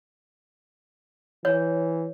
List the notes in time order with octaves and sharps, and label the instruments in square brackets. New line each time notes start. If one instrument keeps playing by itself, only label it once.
[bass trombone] E3 [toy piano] C#5